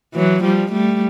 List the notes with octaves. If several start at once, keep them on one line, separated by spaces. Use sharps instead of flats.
E3 F#3
F3 G3
G3 A3